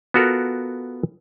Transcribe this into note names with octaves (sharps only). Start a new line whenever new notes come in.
B3 F4 F#4 A4 A#4